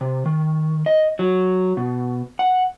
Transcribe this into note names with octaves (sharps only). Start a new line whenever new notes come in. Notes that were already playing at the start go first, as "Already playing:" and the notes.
C3
D#3
D#5
F#3
B2
F#5